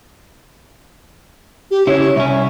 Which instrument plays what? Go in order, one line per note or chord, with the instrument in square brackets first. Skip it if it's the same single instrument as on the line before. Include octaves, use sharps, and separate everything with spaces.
[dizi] G4
[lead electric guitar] C#3 E4 [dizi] C#5
[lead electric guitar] C2 C#4 [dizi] E5